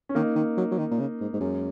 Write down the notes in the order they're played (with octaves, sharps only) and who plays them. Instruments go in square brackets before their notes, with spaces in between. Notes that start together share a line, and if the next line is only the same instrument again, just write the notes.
[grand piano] C#4
[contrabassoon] D#3 [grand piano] A#3 D#4
[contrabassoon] D#3
F#3
F#3
D#3
A#2
C#3
G#2
G#2
[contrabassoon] F#2 [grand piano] G#3 C#4